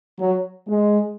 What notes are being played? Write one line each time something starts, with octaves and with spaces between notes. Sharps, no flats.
F#3
G#3